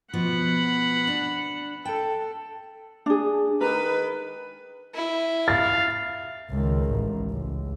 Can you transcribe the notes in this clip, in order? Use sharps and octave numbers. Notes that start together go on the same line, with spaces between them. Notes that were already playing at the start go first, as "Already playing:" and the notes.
B2 F3 B3 F#5 B5
D4
A4 G5
D4 G#4
D#3 G#3 A#4 B4
E4
F5 A6
C#2 D#3
A1
C#2